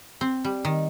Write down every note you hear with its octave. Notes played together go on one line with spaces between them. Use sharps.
C4
G3
D#3